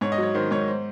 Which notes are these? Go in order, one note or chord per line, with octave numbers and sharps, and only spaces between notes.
G#2 C#5
D#5
F#3 C#5
D#3 C5
G#2 C#5
C5